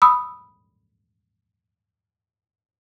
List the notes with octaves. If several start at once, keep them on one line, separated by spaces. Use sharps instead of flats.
B5 D#6 E6